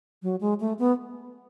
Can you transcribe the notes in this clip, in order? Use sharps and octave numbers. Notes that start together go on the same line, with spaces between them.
F#3
G#3
A3
B3